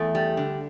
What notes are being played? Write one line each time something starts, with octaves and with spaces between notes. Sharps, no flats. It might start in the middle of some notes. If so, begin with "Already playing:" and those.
Already playing: E2 A3
G3
D3